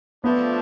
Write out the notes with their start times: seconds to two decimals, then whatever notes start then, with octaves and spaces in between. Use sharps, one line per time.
0.23 F3 A3 B3 D4